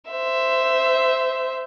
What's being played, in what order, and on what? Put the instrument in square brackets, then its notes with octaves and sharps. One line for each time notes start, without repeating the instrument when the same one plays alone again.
[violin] C5 E5